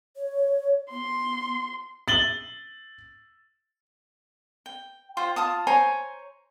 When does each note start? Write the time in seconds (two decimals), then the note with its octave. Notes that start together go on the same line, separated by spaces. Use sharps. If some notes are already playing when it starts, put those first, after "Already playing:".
0.16 C#5
0.91 B3 C6
2.08 A6 F#7 G7
4.66 G5
5.17 F4 C5 G5
5.36 F4 A5 D#6
5.67 C5 C#5 G#5 A#5